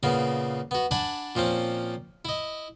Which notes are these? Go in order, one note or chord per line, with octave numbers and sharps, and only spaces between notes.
A#2 C#3 A#3 B3
B3 F#4
D4 F#5 G#5 A5 B5
A#2 F3 C4 C#4
E4 D#5